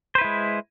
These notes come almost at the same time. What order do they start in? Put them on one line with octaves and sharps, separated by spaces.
C5 B4 E4 G#3